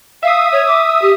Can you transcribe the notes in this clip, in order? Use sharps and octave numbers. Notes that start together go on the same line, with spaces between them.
E5 F5 D#6
C#5
D6
E6
G4